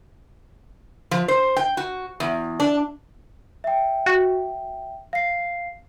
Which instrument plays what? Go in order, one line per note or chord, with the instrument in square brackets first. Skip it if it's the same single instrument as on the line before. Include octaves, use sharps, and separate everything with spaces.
[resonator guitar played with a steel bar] F3
C5
G5
F#4
E2
D4
[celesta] E5 G5
[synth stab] F#4
[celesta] F5 C7